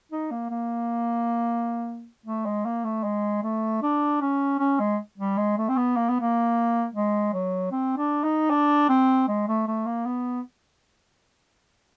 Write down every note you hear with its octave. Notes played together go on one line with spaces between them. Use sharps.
D#4
A#3
A#3
A3
G#3
A#3
A3
G#3
A3
D4
C#4
C#4
G#3
G3
G#3
A3
C4
B3
A#3
B3
A#3
G#3
F#3
C4
D4
D#4
D4
C4
G#3
A3
A3
A#3
B3